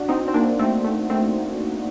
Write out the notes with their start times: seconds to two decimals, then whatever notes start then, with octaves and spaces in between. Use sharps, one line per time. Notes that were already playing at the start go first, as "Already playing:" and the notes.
Already playing: D4 F#4
0.09 C4 D#4
0.28 C4
0.34 A#3 D4
0.59 A3 C4
0.84 A3
1.10 A3 C4